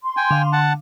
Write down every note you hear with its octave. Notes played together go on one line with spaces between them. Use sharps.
C6
G5 G#5
D3 F5
F#5 A5